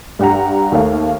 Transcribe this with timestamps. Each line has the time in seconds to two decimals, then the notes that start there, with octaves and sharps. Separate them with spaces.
0.19 G2 G4 F#5 A#5
0.72 D#2 A3 F5